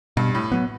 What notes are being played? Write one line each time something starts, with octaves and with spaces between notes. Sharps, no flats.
G2 B2
A2
F#3 B3